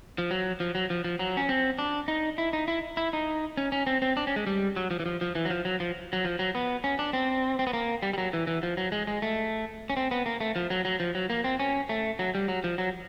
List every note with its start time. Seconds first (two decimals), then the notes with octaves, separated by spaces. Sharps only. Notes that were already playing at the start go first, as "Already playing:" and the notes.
0.18 F3
0.31 F#3
0.60 F3
0.75 F#3
0.90 F3
1.04 F3
1.19 F#3
1.37 C#4
1.49 C4
1.79 D4
2.08 D#4
2.38 E4
2.53 D#4
2.68 E4
2.97 E4
3.13 D#4
3.57 C#4
3.72 C#4
3.87 C4
4.02 C4
4.17 D4
4.27 C#4
4.36 G#3
4.47 G3
4.76 F#3
4.91 F3
5.00 E3
5.06 F3
5.21 F3
5.35 E3
5.45 F#3
5.50 F3
5.65 F#3
5.80 F3
6.13 F#3
6.25 F3
6.39 F#3
6.55 B3
6.84 C#4
6.99 D4
7.13 C4
7.59 C4
7.67 B3
7.73 A#3
8.02 G3
8.13 G3
8.18 F#3
8.33 E3
8.47 E3
8.63 F3
8.77 F#3
8.92 G#3
9.07 G#3
9.22 A3
9.90 C#4
9.97 C4
10.11 B3
10.26 A#3
10.40 A3
10.56 F3
10.70 F#3
10.85 F#3
11.00 F3
11.15 F#3
11.30 A#3
11.44 C4
11.59 C#4
11.89 A3
12.19 F#3
12.35 G3
12.48 F#3
12.64 F3
12.78 F#3